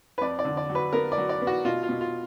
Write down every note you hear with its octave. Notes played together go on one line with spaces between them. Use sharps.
B4
F2 D5
D5
D3
D5
F#3
B4
B3 A#4
D5
F#3
D5
B3
F#4
B2 F4
F4
B2
F4